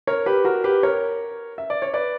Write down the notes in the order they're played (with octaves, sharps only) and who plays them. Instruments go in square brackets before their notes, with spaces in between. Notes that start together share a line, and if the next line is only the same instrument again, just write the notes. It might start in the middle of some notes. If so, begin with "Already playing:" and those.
[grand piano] A#4 C#5
G4 B4
F#4 A#4
G4 B4
A#4 C#5
E5
D5
C#5
B4 D5